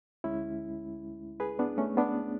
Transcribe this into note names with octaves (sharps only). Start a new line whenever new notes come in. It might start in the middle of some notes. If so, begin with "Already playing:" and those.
D2 D3 G#3 C#4 E4
G#4 B4
B3 D4
A3 C#4
B3 D4